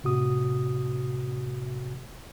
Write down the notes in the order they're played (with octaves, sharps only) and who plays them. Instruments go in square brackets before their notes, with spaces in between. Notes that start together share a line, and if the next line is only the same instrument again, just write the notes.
[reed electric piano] A2 C3 F#4 D#6